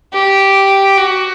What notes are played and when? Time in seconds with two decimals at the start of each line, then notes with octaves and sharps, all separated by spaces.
0.13 G4
0.98 F#4